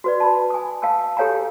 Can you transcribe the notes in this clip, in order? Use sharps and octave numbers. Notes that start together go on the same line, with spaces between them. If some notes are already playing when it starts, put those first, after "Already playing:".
F#4 B4 D5
A5 B5
G#5 D#6
F5 G5 A5 E6
G4 A4 C#5 F5 G#5 A#5